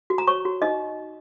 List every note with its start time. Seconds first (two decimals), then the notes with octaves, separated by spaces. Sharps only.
0.10 F#4
0.18 A#5
0.27 C#5 C#6
0.45 F#4
0.62 D#4 D#5